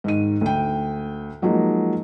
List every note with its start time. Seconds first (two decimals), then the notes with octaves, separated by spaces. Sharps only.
0.04 G#2 D#3 D#7
0.41 D2 G5
1.42 F3 F#3 G#3 A#3 D#4